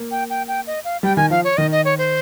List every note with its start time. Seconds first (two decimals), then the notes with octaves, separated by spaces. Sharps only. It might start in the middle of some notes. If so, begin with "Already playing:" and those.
Already playing: A#3
0.11 G5
0.30 G5
0.48 G5
0.67 D#5
0.85 F5
1.03 G3 G5
1.17 D#3 G#5
1.30 F3 F5
1.44 C#5
1.57 D#3 D#5
1.72 D#5
1.85 C#5
1.98 C5